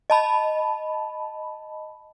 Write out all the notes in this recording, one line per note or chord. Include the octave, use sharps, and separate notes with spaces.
D#5 A5 B5